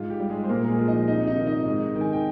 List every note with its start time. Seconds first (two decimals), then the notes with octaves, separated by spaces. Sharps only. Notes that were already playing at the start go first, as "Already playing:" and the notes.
Already playing: G#2 F4
0.10 G4
0.20 G3
0.29 G#3 G#4
0.44 C5
0.49 A#2 A#3 A#4
0.65 A#4
0.68 G#3 G#4
0.79 F3
0.88 D#4 D#5
1.07 C3 D#4 D#5
1.27 D#4 D#5
1.36 D#3
1.46 D#4 D#5
1.66 G#2
1.95 D#3
2.01 G#5
2.13 G5